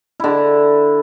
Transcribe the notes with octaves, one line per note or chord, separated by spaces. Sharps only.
D3 E4